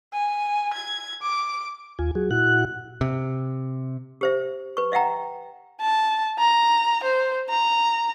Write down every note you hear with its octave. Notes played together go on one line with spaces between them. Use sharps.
G#5
G#6
D6
D#2 F4 G#5
F#3 F#4 G#4
A#2 E4 F#4 F#5 F#6
C3
G4 C5 E5
B4 C#6
D#5 E5 F#5 G5 A#5
A5
A#5
C5
A#5